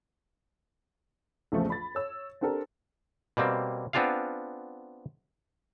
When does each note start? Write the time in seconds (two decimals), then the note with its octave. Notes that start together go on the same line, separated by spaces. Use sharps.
1.52 A#1 E2 C#3 F3 A3
1.70 B5 A6
1.95 C#5 E6
2.41 C4 D4 G4 A4 A#4
3.37 B2 G3 A#3 C4
3.93 B3 C4 D4 F4 G#4 F5